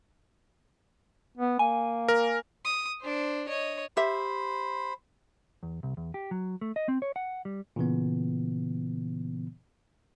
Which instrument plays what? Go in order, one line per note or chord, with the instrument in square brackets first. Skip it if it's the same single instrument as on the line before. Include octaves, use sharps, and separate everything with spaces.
[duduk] B3
[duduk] A#3 [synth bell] G#5
[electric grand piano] A#4
[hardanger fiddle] D#6
D4 C5
C#5 D#5
[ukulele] G4 E5 [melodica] C5 B5
[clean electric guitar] E2
C2
E2
G4
F#3
A3
D#5
C4
C#5
F#5
G3
[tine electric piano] A#2 C#3 E3 B3